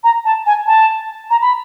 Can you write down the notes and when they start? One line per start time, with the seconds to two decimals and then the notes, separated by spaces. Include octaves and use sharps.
0.04 A#5
0.25 A5
0.46 G#5
0.67 A5
1.30 A#5
1.42 B5